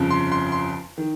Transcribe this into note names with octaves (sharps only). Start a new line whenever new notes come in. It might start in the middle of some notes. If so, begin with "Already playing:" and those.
Already playing: G1 F2 C#3
C6
C6
C6
D#3